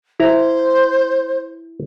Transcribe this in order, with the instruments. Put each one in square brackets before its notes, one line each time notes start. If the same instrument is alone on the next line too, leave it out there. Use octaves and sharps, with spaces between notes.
[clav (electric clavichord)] E4 A#5 [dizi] C5